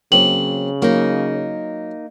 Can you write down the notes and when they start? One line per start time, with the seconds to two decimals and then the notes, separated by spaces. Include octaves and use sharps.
0.12 C#3 F#3 A#3 C4 F#7
0.82 F#3 A#3 D#4